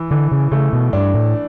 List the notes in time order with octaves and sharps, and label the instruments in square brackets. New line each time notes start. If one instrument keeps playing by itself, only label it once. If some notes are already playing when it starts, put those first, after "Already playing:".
Already playing: [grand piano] E3
[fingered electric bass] D3 [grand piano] E3
[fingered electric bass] C#3
[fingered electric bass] C#3 [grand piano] A3
[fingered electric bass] B2
[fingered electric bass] G2 [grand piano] D4
[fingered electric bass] A2